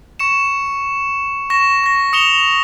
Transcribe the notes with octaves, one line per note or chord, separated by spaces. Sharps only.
C#6 C#7 E7
C#6 A#6 E7
C#6 A#6
D#6 C#7 E7 F7 G7